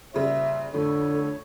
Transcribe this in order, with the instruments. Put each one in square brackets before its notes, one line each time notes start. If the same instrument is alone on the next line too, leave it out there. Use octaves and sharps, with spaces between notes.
[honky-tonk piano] A#2 C#3 G3 [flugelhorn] C5 [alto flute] E5
[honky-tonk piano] F2 A2 [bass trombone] D3 [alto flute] A4 [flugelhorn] C#5